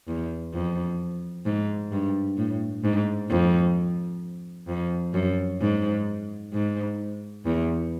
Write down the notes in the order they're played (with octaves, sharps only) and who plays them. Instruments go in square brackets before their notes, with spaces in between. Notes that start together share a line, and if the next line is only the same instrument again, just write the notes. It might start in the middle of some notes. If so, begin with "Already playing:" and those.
[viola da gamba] E2
F2
G#2
G2
A2
G#2
F2
F2
F#2
G#2
G#2
E2